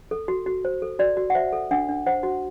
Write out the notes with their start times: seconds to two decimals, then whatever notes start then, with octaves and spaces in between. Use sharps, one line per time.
0.11 A4
0.28 F#4
0.46 F#4
0.65 C5
0.82 A4
0.99 F#4 D5
1.17 F#4
1.30 F#5
1.35 C5 E5
1.53 A4
1.71 D4 F#5
1.89 D4
2.06 C5 F#5
2.23 F#4